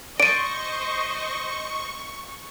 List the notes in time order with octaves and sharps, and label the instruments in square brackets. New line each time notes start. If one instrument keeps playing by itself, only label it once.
[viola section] C5 D#5 [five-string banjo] D5 [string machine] C#6 [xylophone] D7 D#7